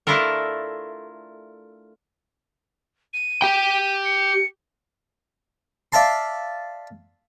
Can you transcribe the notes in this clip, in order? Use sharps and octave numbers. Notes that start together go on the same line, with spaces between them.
A3 D4 E4 F4 A4 A#4
D#7
G4 G5
C#7
D5 E5 F5 A5 C6